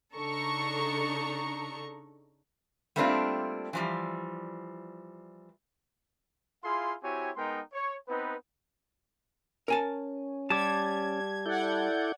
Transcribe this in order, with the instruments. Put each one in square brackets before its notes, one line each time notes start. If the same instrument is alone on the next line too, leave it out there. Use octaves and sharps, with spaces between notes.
[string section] C#3 D4 D#4 A4 A#5 C#6
[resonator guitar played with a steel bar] G3 A3 A#3 C4 D4 F4
E3 F3 G3
[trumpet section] E4 F4 G#4 F5 C6
C4 E4 F#4 G4 C#5 G#5
G#3 B3 D#4 A#4 G5 C6
C#5
B3 C4 D#4 B4
[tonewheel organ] C#4 [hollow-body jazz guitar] A#4 G#5 A5
[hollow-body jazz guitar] G3 [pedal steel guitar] A5 D6 [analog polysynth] G#6
[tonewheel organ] E4 A4 G6 [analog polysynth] D5 F#5 G#6